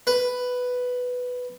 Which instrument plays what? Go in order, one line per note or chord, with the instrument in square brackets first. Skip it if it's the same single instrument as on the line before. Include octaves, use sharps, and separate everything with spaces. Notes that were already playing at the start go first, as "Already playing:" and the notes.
[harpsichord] B4